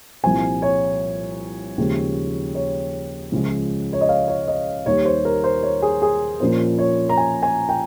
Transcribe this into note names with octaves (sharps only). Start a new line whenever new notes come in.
C2 A#2 F3 C4 G#5
C#5
D#2 C#3 F3 G#3
C#5
C#2 C#3 F3 G#3
C#5
D#5
F5
C#5
D#5
D#2 D#3 G3 C#5
C5
A#4
C5
C#5
G#4
G#4
A#1 A#2 F3 A#3 C#4 C5
C#5
A#5
G#5
G#5
G5